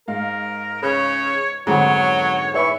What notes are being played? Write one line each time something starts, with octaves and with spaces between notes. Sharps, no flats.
G#2 A#4 F5
C#3 B4 C#5
F2 G#2 D3 F#3 B3 C#5 F#5
E3 C#5 E5 B5 C#6